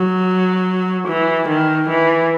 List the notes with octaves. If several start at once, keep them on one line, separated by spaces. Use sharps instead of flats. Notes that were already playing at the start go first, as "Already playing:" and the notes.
Already playing: F#3
E3
D#3
E3